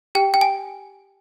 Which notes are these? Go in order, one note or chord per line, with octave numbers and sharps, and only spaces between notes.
G4 G5
G5
G#5